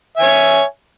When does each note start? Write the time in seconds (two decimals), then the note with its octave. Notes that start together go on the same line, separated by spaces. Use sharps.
0.17 E5
0.20 G#5
0.22 C#5